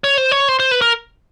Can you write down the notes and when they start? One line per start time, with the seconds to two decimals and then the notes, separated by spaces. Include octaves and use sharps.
0.04 C#5
0.18 C5
0.32 C#5
0.49 C5
0.60 C5
0.71 B4
0.81 A#4